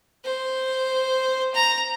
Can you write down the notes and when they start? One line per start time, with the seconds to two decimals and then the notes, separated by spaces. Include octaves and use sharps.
0.25 C5
1.54 A#5